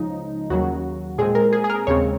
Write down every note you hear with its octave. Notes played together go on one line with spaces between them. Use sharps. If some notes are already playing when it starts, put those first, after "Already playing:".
Already playing: C#2 C#3 F3 D#4
D#2 C#3 F#3 F#4
A#2 G#3 C4 G#4
A#4
G#4
G#4
A#4
D#2 C#3 G#3 C4 C#5